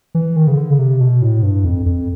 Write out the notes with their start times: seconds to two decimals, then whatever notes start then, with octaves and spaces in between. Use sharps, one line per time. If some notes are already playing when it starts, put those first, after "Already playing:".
0.15 E3
0.36 D#3
0.47 C#3
0.57 D3
0.71 C#3
0.79 C3
1.00 B2
1.22 A2
1.43 G2
1.65 F2
1.86 F2